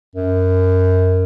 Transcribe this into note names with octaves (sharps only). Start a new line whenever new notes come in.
F#2